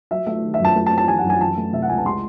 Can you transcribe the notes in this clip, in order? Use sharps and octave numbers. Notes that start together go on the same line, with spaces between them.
F#3 E5
A3 E5
D#3
E5
F#2 A5
A3
A5
C4
A5
E3 G#5
F#5
F#2
G#5
E3 A5
A3
C3 E5
F#5
C#2 G#5
A5
G#3 C6